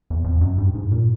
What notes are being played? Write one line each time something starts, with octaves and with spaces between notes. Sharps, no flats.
E2
F2
F#2
G2
G#2
A#2